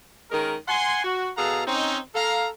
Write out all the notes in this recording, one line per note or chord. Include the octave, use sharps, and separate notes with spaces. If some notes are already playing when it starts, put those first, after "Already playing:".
D#3 G#3 C#4 A#4
F#5 G#5 C6
F#4
B2 G#4 A4 F5 F#5 A#5
C4 C#4 D#4
A4 F5 A#5